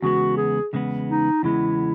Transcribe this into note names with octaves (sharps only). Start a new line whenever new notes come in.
E2 C#3 G#3 B3 F#4
G#4
E2 C#3 G#3 B3
D#4
E2 C#3 G#3 B3 E4